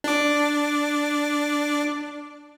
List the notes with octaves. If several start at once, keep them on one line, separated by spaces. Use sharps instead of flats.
D4 D6